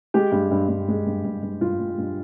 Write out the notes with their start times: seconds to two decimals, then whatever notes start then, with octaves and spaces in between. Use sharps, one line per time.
0.14 G#3 G4
0.32 G2
0.51 G2
0.69 G2
0.88 G#3
1.07 G2
1.25 G2
1.43 G2
1.61 G2 F4
1.79 G2
1.98 G2